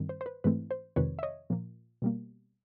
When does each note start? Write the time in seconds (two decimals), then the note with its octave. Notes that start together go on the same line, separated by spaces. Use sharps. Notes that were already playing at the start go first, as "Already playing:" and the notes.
Already playing: G2 D#3 G3 C4
0.09 C5
0.21 C5
0.26 B4
0.44 G#2 E3 A3 C4 B4
0.71 C5
0.96 F2 C3 D#3 G#3 C4 B4 C#5
1.19 E5
1.23 C#5 D#5
1.50 A#2 F3 A#3
2.02 B2 G3 A#3